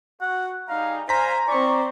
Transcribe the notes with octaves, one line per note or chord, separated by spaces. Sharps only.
F#4 F#5
G3 D#4 G#4 F5 A#5
G3 C5 F5 G#5 A#5 B6
C4 E4 C5 D5 C#6